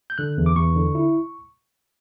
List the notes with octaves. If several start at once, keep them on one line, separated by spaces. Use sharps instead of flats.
G6
D3 F#6
E2
D6
E2 C#6
D3
E4